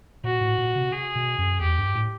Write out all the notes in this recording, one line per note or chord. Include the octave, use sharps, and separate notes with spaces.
A#2 F#4
A2
A#2
C3
G#4
B2
F#2
E2 G4
G2
A2